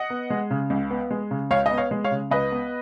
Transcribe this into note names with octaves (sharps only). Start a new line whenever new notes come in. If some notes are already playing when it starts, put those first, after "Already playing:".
Already playing: D#5 F#5
B3
G#3
C#3
C#2
B3
G#3
C#3
C#2 C#5 F5
D#5
B3
C#5 F5
G#3
C#5 F5
C#3
C#2 B4 D#5
B3